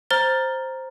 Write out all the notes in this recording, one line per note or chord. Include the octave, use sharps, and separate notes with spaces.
C5 A#5 F6 A6 G7